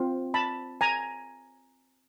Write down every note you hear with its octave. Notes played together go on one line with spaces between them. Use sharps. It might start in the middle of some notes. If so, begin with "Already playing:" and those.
Already playing: C4 F4
A5 B5
G#5 A#5